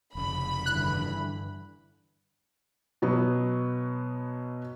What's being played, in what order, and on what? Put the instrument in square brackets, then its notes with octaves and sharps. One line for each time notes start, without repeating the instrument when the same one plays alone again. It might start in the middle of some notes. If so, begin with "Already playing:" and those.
[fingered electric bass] F1 C#3 [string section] B5
[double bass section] G2 D3 E3 [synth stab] F#6
[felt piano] B2 F#3 B3